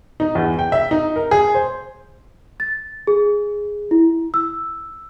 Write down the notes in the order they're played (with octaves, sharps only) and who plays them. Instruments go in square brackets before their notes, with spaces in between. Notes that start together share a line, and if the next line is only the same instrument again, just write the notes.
[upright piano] D#4
E2
G5
E5
D#4
A#4
G#4
C5
[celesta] A6
G#4
E4
E6